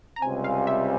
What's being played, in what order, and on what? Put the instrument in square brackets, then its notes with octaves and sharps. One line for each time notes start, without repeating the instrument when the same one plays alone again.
[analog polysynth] A#5
[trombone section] C#2 C3 G3 C4 [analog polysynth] G#5
[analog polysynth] F5
E5